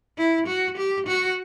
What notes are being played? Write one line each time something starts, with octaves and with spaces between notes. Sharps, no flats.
E4
F#4
G4
F#4